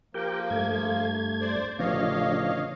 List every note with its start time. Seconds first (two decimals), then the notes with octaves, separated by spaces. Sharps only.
0.14 F3 A#3 G4 A#4 G5
0.50 G2 A3 G#6
1.41 C5 D5
1.79 A1 C#3 F3 D4 C#5 D#5 F5